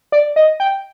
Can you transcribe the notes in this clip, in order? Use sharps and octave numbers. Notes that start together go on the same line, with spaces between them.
D5
D#5
G5